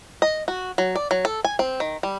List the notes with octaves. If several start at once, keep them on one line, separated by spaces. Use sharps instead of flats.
D#5
F#4
F#3
D5
F#3
A4
G#5
C4
D#3
G3